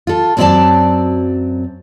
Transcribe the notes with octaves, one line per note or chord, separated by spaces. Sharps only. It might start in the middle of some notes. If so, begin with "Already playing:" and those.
F4 A4
F#2 F#3 C4 D4 D5 A5